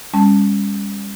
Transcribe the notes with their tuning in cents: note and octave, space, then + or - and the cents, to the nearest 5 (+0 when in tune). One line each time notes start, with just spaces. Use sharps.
G3 +45 C#4 +0 A5 +0